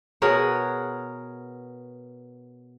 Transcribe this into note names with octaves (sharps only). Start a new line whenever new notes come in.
B2 G#4 A#4 C#5 F#5